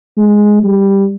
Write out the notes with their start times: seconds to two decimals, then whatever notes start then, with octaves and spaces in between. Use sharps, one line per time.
0.17 G#3
0.64 G3